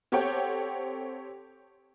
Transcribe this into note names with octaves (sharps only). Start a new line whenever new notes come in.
C4 G4 A4 C#5 F#5 G5